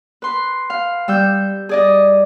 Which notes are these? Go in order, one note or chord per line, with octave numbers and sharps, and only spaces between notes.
B4 C6
F5
G3 E6 G6
G#4 D5 D#5